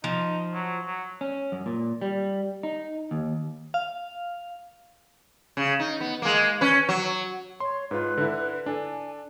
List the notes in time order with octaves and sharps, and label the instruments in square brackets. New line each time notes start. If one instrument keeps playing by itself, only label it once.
[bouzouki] F3 [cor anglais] D#4
[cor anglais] F#3
F#3
[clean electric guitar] C#4
F#2
A#2
G3
D#4
D#2
[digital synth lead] F5
[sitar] C#3
D#4
B3
G#3 A#3
C#4 B4
F#3
[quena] C#5 [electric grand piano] C6
[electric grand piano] G#2 F4 [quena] B4
[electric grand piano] D3 E4
[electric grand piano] D4 A4 [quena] G#5